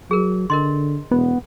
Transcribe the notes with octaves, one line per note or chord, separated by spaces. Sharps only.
F#3 G#4 A#4
D3 A#4 D#5 C6
E1 B3